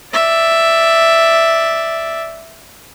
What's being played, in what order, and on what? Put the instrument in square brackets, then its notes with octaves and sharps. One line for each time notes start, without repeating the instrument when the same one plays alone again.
[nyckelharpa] D5 E5